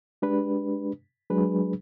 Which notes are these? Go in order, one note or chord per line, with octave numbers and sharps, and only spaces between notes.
G#3 D4 G4 B4
F#3 G#3 D4 G#4 B4